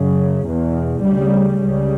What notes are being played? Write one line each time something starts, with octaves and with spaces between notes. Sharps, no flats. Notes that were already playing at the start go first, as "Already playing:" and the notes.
Already playing: F#2 C#3
E2 B2
D2 C#3 G3
C#2 C#3 G3